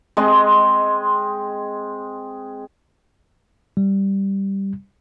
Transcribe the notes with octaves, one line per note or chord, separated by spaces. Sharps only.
G#3 C4 D#5 C6
G3